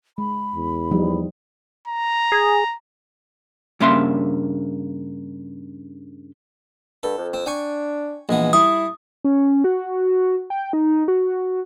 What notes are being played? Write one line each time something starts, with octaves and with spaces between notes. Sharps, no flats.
G#3 B5
E2
F3 G3 D#4
A#5
G#4
G2 C#3 A#3 E5 C6
G2 A4
F2
C4
D4 G5 G#5 C#6
A#1 E3 G#3 B3
G3 E4 D#6
C#4
F#4
G5
D#4
F#4